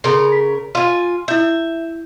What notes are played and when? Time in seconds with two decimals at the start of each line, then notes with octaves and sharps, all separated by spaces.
0.04 C#3 A4 A#4 C6
0.32 B6
0.75 F4 G#5 C6
1.28 E4 E5 G6